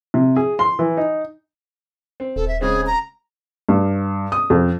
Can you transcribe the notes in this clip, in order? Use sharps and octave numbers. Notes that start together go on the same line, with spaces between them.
C3
G#4
C6
E3
D#4
C4
D#1 A4
E5
C#3 G#3 C4 G#4
A#5
G2
D#6
F2